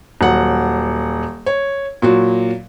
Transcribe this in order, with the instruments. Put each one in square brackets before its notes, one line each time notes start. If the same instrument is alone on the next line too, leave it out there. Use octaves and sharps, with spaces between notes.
[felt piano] D#1 F#3 F#5
C#5
A#2 F#3 F#4